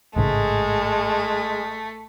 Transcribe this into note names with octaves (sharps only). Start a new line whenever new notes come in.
A1 G#2 C#3 G#3 A3